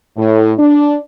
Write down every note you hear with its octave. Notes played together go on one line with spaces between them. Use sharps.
A2
D4